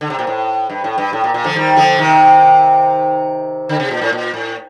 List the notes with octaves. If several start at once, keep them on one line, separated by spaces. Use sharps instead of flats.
D3
C3
A#2
A2
G2
A2
G2
A2
A#2
A#2
D3 F3
D#3 G3
D3 F3
C3 D#3
D3
C3
A#2
A2
A#2
A2